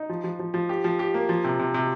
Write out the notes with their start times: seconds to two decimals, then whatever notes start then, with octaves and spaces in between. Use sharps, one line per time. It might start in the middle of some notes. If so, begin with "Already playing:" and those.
Already playing: D#4
0.09 F3
0.24 F3
0.39 F3
0.54 F3
0.69 G4
0.84 F3
0.99 G4
1.14 A#3
1.29 F3
1.44 C3
1.59 C3
1.74 C3